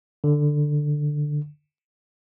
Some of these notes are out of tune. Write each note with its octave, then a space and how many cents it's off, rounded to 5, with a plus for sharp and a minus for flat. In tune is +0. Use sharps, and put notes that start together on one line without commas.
D3 +10